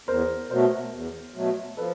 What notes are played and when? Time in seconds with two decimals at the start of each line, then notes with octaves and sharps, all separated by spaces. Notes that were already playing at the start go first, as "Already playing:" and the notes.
0.08 E2 A#4 C5
0.50 B2 F#3 A3 A#4 C5
0.93 E2
1.35 B2 F#3 A3
1.77 F3 A4 B4